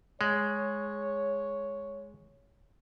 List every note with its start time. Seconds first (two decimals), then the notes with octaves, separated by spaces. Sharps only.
0.21 G#3 C#5